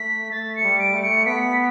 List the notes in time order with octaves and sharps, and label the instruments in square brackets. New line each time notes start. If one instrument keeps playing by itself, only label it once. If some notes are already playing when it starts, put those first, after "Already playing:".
Already playing: [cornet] A3 [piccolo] B6
[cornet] A3 [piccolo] A6
[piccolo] C#7
[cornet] G3
[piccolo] D7
[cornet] A3
[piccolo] C#7
[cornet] B3 [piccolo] B6